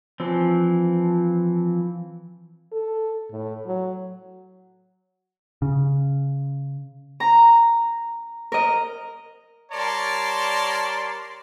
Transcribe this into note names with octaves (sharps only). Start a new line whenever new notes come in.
E3 F3 C4
A4
A2
F#3
C#3
A#5
A#4 D#5
G3 A#4 C#5 D5 A5 C6